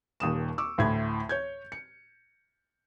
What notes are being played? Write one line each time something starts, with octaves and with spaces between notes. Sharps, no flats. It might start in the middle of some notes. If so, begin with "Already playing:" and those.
D#1 D#2 D#6 E7
C#6 D6 E6
D2 A2 E4 G#6
C#5 G6 G#6
C#7